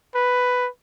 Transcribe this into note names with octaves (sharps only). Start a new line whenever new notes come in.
B4